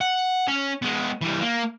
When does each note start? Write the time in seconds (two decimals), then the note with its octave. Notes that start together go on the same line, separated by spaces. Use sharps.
0.01 F#5
0.48 C#4
0.82 G#3 B3
1.21 E3 G3
1.41 A#3